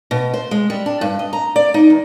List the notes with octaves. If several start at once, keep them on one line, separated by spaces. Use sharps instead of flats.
B2
C5
G#3
G3
D4
G2
D#5
A#5
D5
D#4
E2